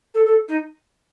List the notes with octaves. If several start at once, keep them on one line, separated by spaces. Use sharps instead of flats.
A4
A4
D#4